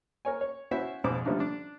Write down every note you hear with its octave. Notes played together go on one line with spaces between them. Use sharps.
A#4 C#5 G#5
C#5
B3 C#4 E4 F#4 C5 E5
F2 G#2 B2 B3 C4 D6
D3 F3 G3 A3 D4 D#4
D4